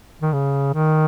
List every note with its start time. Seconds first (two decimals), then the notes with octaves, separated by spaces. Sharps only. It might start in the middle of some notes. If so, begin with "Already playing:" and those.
0.21 D#3
0.33 C#3
0.74 D#3